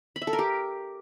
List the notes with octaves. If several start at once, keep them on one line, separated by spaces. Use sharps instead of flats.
B5
E5
A4
A#4
G4